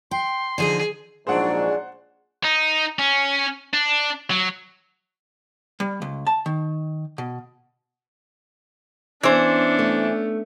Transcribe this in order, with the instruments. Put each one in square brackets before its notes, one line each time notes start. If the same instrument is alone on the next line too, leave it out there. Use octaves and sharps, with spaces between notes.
[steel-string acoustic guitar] G5 [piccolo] C6
[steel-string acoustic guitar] D3 F3 D#4 [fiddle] G#4
[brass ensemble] A#1 G#2 [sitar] F#3 D4 G#4 [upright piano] C5 F#5
[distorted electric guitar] D#4
C#4
D4
F#3
[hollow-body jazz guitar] G3
C#2
A5
D#3
B2
[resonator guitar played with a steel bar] E3 C5 [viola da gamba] B3 C#4 [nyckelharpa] D4
[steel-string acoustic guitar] A3